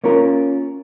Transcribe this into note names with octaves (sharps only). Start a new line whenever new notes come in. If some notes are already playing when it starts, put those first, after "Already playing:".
A#3 C#4 F4 A#4